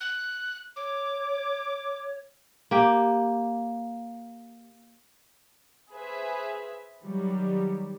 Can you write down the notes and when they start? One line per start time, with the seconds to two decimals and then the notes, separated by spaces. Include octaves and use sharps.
0.01 F#6
0.76 C#5 D6
2.71 A#3 G4
5.93 G#4 B4 C5 E5
7.04 D#3 F#3 G3